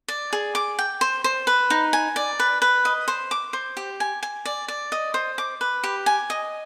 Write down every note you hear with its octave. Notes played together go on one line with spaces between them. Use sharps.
D5
G#4
D6
G5
C5
C5
B4
D#4
G#5
D5
B4
B4
D#5
C5
D6
C5
G4
G#5
G#5
D5
D5
D#5
C5
D6
B4
G4
G#5
D#5